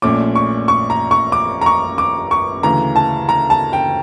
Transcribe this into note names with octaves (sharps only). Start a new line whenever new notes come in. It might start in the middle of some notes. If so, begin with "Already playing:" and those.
A#1 A#2 A3 C#4 D6
C#6
C#6
A#5
C#6
D6
A#5
C#6
D6
C#6
D2 C#3 E3 A#5
A5
A#5
A5
G5